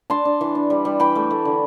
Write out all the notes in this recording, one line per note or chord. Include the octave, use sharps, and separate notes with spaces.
D4 A5 C6
D4
E3
D4
G3
G3
E3 G5 B5
A3
A3
D3